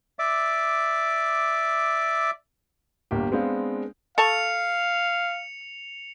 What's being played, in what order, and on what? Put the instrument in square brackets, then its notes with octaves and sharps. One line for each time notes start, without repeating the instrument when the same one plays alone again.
[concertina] D5 E5 D6
[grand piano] G1 A#3 G4
G#3 B3 C4 D4 F5
[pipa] A4 A5 C#6 [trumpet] F5 [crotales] C#7 F7